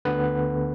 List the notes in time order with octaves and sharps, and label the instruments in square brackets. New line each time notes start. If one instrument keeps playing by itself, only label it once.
[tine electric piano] D2 D3 B3 B4